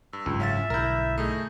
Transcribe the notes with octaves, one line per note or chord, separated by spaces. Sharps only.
G2 E6
F#1 C#2 G#2
C#4 E5 F5 A6
B1 G2 D3 E4 A#4 E6 G6
A3 D#4 G#4